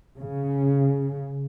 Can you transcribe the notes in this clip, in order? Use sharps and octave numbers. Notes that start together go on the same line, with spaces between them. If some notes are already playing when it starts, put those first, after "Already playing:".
C#3